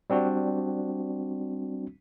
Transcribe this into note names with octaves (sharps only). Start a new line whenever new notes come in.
G3 C4 D4 F#4